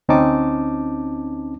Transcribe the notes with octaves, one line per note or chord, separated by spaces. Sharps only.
D2 C4 C#4 D#4 A5 D6